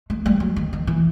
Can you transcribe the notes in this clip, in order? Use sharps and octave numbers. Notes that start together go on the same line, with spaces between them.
A3
G3
F#3
D#3
D#3
E3